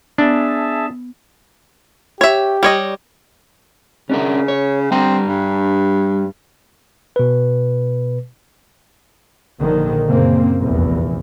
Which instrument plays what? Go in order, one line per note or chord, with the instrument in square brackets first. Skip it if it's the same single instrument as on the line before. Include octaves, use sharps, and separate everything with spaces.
[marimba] B3 [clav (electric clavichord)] D4 [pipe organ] G#4 E5 A5
[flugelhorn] G4 [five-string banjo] C#5 E5
[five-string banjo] G3 C#5 D#5
[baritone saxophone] C#3 [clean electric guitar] C#4 D4 A#4
[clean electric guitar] C#5
[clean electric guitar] G3 D4 A#5 [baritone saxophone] C4
[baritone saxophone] G2
[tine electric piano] B2 B4
[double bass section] A#1 D3 D#3
F#2 A#2 C#3 A#3 C4
F1 A#1 E2